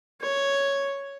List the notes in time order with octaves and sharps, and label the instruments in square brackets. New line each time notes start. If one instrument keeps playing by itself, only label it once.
[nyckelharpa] C#5